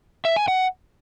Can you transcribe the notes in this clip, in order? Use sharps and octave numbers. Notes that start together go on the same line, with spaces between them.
E5
G#5
F#5